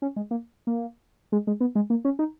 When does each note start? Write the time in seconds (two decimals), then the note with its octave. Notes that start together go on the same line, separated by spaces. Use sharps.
0.02 C#4
0.16 G#3
0.31 A#3
0.67 A#3
1.32 G#3
1.47 G#3
1.61 B3
1.75 G#3
1.90 A#3
2.05 C#4
2.19 D#4